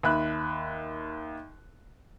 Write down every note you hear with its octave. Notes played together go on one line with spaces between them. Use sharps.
D#2 E5 B5 F#6